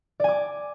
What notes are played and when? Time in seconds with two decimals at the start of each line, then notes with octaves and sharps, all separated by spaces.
0.20 D5
0.24 G#5
0.28 D6